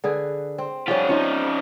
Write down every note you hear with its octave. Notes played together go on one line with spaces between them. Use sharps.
D3 G#4 B4
C4
F3 G3 C#4 F4 G4
F3 C4 C#4 D#4